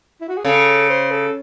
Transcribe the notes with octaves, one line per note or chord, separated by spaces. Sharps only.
E4
F#4
G#4
C#3 A4
C5
A4